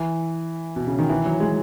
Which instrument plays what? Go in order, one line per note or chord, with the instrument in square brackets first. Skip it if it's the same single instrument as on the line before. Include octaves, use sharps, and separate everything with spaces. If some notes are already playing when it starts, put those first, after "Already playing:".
Already playing: [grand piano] E3
B2
C#3
D#3
E3
F#3
G#3